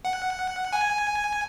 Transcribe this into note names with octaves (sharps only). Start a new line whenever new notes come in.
F#5
G#5